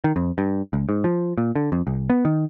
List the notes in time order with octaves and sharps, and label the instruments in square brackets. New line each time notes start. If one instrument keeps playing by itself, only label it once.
[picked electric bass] D#3
F2
G2
C#2
G#2
F3
A#2
D3
F2
C2
B3
D#3